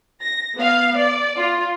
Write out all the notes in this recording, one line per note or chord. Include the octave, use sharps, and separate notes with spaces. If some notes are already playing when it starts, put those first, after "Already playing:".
A#6
B3 F5
D5
F4